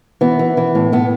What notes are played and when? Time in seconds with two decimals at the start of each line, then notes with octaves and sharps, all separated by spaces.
0.21 E3 B3
0.39 E3
0.57 E3
0.75 A2
0.92 A2 B3